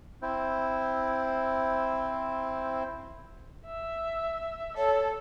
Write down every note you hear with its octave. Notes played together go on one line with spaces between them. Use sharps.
C4 E4 C5
E5
A4 C#5